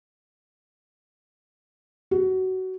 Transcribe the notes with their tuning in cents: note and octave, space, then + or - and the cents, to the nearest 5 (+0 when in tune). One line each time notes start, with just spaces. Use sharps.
F#4 +20